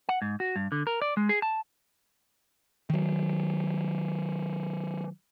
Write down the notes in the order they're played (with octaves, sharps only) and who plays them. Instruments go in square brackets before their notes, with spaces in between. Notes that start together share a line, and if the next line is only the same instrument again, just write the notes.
[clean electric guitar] F#5
G#2
F#4
G2
D3
A#4
D5
G#3
G#4
A5
[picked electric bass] D#3 F#3